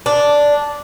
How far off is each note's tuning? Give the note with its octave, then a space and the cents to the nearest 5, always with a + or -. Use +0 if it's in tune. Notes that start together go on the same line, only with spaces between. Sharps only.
D4 -5